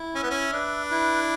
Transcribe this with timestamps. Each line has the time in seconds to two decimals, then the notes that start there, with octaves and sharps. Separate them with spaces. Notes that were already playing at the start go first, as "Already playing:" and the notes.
Already playing: E4
0.15 C#4 E5
0.23 B3
0.31 C#4
0.53 D4 B4
0.91 E4